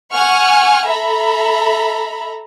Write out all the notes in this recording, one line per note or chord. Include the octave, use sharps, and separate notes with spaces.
F#5 G#5 C#6 F6
A4 E5 A#5 B5